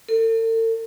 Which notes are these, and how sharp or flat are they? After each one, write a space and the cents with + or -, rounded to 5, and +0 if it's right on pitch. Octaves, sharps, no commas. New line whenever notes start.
A4 +45